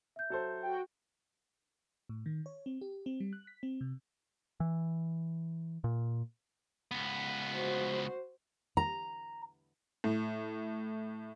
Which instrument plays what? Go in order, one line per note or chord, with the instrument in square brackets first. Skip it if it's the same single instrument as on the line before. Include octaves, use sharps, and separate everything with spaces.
[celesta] E5 G6
[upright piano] F#3 A4 C5
[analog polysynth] F#4 G5
[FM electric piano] A2
D#3
C#5
C4
G4
C4
G3
F#6
B6
C4
C3
[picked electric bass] E3
A#2
[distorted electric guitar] C#2 B3
[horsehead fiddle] F#4 C5
[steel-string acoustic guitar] A#5
[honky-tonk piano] A2